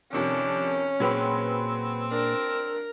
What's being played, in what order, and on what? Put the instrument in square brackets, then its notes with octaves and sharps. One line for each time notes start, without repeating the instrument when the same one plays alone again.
[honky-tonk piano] F2 C3 D#3 [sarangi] C#4 [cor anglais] D4
[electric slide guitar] A#2 G#4 G5 [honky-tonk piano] F#3 B4 C6 [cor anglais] C4
[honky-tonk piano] D4 [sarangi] A#4